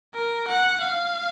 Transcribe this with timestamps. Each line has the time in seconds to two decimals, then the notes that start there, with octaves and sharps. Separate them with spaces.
0.14 A#4
0.48 F#5
0.81 F5